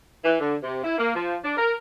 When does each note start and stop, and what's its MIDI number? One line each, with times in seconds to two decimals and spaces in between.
0.24 0.37 52
0.40 0.56 50
0.63 0.80 48
0.84 0.95 64
0.98 1.10 58
1.14 1.37 53
1.44 1.57 62
1.57 1.76 70